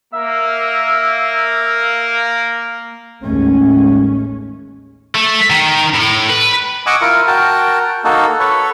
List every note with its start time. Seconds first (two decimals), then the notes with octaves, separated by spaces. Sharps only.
0.13 A#3 E5
3.22 A1 D#2 G#3 A3 C#4
5.15 A3
5.50 D#3
5.95 A2
6.30 B4
6.86 D#5 F#5 G#5 C#6 D6 E6
7.01 E4 F4 A#4
7.27 F#4 A#4 G5 A5
8.04 A#3 D#4 F#4 A4
8.40 A4 B4 C#5